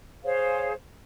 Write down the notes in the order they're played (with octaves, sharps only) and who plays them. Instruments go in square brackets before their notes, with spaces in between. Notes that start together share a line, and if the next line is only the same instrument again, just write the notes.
[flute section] G#4 C5 C#5 F5